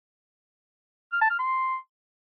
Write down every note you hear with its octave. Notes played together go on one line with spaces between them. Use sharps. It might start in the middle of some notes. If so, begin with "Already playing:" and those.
F6
A5
F6
C6